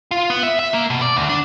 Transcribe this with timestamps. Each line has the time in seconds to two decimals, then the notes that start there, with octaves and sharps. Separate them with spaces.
0.11 F4
0.30 B3
0.43 E5
0.59 E5
0.73 A#3
0.90 B2
1.02 D5
1.16 D2
1.29 D4